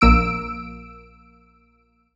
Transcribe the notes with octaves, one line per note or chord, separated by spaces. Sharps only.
A#1 A#3 E6 D7